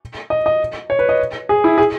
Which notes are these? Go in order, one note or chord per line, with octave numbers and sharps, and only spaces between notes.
D#5
D#5
C#5
B4
D#5
G#4
E4
G#4